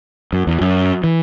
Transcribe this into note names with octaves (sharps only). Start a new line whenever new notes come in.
F#2
E2
F#2
E3